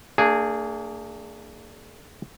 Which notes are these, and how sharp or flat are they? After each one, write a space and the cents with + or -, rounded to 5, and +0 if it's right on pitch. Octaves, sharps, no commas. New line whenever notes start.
A#3 -45 D4 +0 G#4 -5